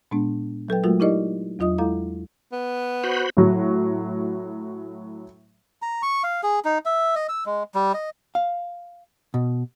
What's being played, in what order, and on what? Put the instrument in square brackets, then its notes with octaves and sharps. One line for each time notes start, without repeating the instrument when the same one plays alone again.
[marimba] A#2 G#3 B3 D4
F#3 A4 B4 G5
F#3 G#3 A3 F4 F#4 A#4
D#4 E4 G4 A#4 D5 D#5
E2 F#3 F4 D#5 D#6
G#3 E4 A4 F5 A#5
[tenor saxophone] B3
[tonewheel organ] F#4 C5 B5
[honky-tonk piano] A2 F#3
[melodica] A#5
C#6
F5
G#4
D#4
E5
D#5
E6
G#3
G3
D#5
[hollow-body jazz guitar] F5
B2